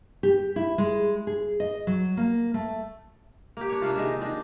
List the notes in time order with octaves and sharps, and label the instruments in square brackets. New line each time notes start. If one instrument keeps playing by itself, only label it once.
[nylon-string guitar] G4
E4
G#3
G#4
D#5
F#3
A#3
A3
[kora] A#3 G4
D4 C#5
C3 A#3 D4 F4
D#3 G#3 F4 E5
D#4
D#3 D4